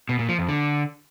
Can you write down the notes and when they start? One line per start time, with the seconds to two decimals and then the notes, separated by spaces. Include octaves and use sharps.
0.09 B2
0.19 A#2
0.29 F3
0.39 F2
0.49 D3